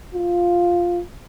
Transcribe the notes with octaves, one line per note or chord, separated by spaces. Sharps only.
F4